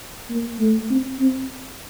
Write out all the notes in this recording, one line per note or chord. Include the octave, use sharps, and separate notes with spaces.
A#3
A3
C4
C4